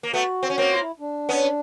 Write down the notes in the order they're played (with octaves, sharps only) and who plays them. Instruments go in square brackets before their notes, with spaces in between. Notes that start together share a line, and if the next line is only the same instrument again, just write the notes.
[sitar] A#3
[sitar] A3 B3 [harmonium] F#4
[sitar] C4
C#4
A#3 C4
[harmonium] F4
E4
D4
[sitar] B3 C#4